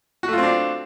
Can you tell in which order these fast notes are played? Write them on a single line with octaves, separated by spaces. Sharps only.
F#4 A3 F4 C4 D4